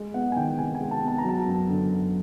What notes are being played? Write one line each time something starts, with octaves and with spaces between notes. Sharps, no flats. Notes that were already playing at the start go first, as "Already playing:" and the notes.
Already playing: G#3
B3 F#5
G#5
D#3 G5
C3 G#5
G#5
G#3
A5
B3
A5
A#5
F#3 A5
F#2
D3
F#2